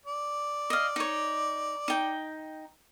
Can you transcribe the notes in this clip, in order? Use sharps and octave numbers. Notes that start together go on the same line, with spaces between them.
D5
D#5 F5
D#4 C#5
D#4 G5